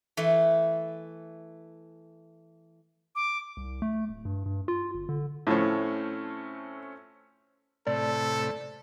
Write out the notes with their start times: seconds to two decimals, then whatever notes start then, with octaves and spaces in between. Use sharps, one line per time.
0.17 E3 A3
3.15 D6
3.57 C2
3.82 A3
4.09 D1
4.25 G2
4.46 G2
4.68 F4
4.95 G1
5.09 D3
5.47 A2 F3 A3 C4 C#4
7.87 A2 C3 A4 D5